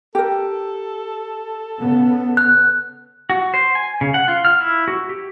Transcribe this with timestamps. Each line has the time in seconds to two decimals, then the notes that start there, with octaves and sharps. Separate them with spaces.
0.15 G4 A4 A#4
1.79 C#3 B3
2.37 F#6
3.30 F#4
3.54 C5
3.75 G#5
4.01 C#3
4.14 F#5
4.28 F4
4.45 F6
4.61 E4
4.88 F#4
5.09 G4